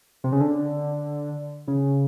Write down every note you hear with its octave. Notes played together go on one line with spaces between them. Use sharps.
C3
C#3
D3
C#3